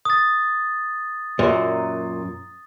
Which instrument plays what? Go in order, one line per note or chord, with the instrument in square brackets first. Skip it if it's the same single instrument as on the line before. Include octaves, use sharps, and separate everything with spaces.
[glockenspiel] D#6 A6
[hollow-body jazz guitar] F#2 A#2